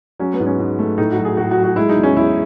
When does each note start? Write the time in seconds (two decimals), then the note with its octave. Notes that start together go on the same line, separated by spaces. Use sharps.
0.19 F#3 C#4
0.33 B3
0.40 G#2
0.46 C#4
0.59 G#2
0.79 A3
0.98 A2 D#4
1.12 F#4
1.18 F#3
1.25 G#4
1.37 A2 F#4
1.51 F#4
1.57 F#3
1.64 F#4
1.76 G#3 E4
1.89 D#4
1.96 E2
2.03 C#4
2.16 E2 E4